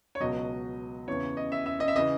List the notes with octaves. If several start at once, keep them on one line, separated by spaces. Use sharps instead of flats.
C#5
C#2 B2 F#3 D#5
E2 C#3 E3 C#5
D#5
E5
E5
D#5
E5
C#3 E3 D#5